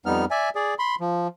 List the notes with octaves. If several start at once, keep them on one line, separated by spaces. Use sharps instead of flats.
F2 G3 B3 D#4 F6
D5 E5 G#5
G#4 D5
B5 C6
F3